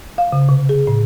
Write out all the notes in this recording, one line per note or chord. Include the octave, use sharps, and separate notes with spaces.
F5
C#3
C3
G#4
A2